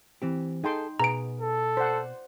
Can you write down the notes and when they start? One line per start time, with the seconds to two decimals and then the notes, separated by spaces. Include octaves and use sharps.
0.22 E3 C4 G4
0.64 D#4 G#4 A4 G5 C6
1.00 B2 G#4 B4 A#5 D7
1.41 A4
1.77 C5 D5 F#5